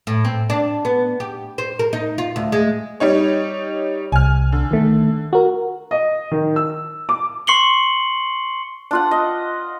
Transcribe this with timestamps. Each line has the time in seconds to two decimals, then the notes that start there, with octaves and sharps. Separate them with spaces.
0.07 A2
0.25 C4
0.50 D4
0.85 B3
1.20 G4
1.58 C5
1.79 A#4
1.93 D#4
2.18 F4
2.36 D2
2.52 G#3
3.00 G3 D#4 C#5
4.12 C2 G#5 F6
4.52 D3
4.71 D#3 A3
5.33 F#4 A#4
5.91 D#5
6.31 D#3
6.56 E6
7.09 D6
7.47 C6 C#6 C7 C#7 F#7 G7
8.91 D4 F4 F#5
9.11 D#5